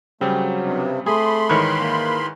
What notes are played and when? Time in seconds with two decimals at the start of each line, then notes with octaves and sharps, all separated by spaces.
0.21 C#3 F#3 G3 A3 C4
0.62 G2 C3
1.06 A3 G#4 B5 C6
1.49 G#2 D#3 E3 A#4 B4 C#5
1.80 A#3